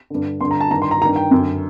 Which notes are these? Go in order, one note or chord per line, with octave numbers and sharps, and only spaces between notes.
G2 D3
G2 D3 C6
A#5
A5
G2 D#3 A#5
C6
A#5
G2 D#3 A#5
G5
F#2 D3